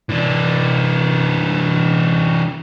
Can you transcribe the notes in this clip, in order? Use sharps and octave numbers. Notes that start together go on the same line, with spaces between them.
E3 D4